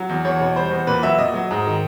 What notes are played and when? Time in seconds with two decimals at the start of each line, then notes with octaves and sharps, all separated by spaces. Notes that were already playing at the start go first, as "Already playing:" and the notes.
Already playing: F#3
0.09 E2
0.25 E2 C#5
0.40 B2 C#5
0.56 G3 C5
0.71 E2
0.87 A#2 B4
1.03 F#3 E5
1.18 A#2 D#5
1.34 F#3
1.51 G#2
1.67 D#3